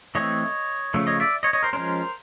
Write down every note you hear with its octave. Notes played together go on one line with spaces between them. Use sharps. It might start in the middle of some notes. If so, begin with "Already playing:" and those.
E3 A3 C4 C#5 D#5
C#3 F3 A3
C#5 D#5
D5 E5
C#5 D#5
C#5 D#5
A#4 C5
F3 G#3 C#4 A#4 C5